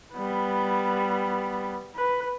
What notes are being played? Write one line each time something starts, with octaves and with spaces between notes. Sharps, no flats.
G3 B3
B4